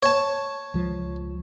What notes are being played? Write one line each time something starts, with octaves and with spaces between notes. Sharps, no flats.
C#5 A5
C#2 F3